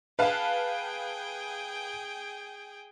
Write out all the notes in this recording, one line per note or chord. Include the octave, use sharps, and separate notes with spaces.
G#4 B4 F5 G5 A5